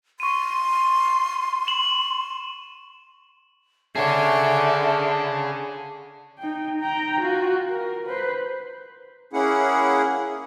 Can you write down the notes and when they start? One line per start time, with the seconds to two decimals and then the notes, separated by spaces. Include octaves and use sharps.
0.20 C6 C#6 D#7
1.67 E7 F#7
3.96 D3 G#4 C#5 E5 A5
6.39 D#4 G5
6.80 G5 A#5
7.21 F4 F#4
7.69 A#4
8.07 B4 C5
9.33 A#3 C#4 E4 G#4 F#5